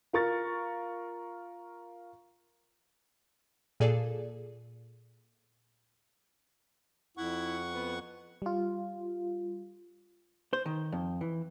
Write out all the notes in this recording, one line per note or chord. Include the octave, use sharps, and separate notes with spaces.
F4 A#4 C#6 A6
A#2 G#4 A4 D5
F2 E4 F#5 C#6
B3
G3 F4
C5
D#3
F2
E3